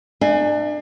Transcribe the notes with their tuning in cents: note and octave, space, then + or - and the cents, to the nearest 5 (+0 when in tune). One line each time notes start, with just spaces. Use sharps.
D4 +35 E5 +0 G#5 +0